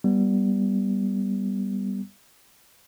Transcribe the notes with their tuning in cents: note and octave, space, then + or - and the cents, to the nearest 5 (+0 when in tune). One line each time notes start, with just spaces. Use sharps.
G3 +0 B3 -15